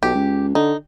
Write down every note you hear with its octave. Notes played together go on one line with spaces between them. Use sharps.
B1 G4
C#2
D3 D#4